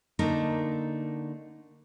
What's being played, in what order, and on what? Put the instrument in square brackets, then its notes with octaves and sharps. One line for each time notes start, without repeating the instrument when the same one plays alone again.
[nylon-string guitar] D3 A3 A#3 D#4 A#4